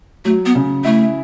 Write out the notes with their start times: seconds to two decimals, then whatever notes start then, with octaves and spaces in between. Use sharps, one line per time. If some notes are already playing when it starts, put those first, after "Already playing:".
0.25 F#3 A3
0.46 B3
0.55 C#3
0.85 A3 E4